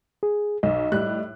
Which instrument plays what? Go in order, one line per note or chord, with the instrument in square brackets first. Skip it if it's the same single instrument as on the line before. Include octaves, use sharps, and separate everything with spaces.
[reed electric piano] G#4
[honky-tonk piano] B1 [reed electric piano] D#5
[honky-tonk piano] A2 G3 F#6